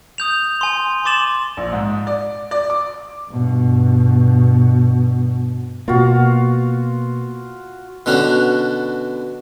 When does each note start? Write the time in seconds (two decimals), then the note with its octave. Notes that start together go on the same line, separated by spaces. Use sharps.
0.18 D#6 G6 F7
0.61 G#5 C6
1.05 C6 D6 A6 E7 F#7
1.57 A#1
1.73 G#2
2.07 D5
2.51 D5
2.70 D6
3.29 G2 B2
5.88 B2 A#3 F4 F#4
8.06 B2 D3 C#4 D4 F#4